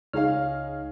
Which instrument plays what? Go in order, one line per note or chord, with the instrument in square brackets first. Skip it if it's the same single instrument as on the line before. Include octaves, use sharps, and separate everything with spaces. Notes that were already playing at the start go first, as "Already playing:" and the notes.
[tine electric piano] C#2 C#5 F6 [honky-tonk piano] D#4 G#4 F5